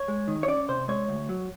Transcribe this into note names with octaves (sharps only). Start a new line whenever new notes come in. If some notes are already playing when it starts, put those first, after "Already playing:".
Already playing: C#5
G#3
D#3
C#5
C#4 D5
C3 C5
G#3 C#5
D2
F#3